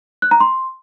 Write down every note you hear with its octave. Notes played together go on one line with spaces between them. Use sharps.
F#6
A#5
C6